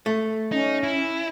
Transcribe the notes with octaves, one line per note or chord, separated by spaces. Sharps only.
A3
C#4 D#4
E4